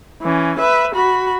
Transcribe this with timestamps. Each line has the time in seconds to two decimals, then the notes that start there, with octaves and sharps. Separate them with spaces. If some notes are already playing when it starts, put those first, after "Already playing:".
0.22 E3 C#4
0.59 B4 E5
0.95 F#4 B5